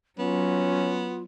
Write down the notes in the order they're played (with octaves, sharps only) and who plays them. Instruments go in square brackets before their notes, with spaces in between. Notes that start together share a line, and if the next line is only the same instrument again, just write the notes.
[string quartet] F#3 [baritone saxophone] B3 [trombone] C#4 [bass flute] F4